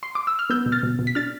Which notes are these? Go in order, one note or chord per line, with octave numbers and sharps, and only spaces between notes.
C6
D6
E6
F6
B3 E6 G6
B2
F6 A6
B2
B2
B6
D4 F6 A6